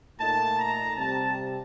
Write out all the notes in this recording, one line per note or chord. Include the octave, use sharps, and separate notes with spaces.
A#2 A3 D#4 A5
A#5
C3 G3 C4 A5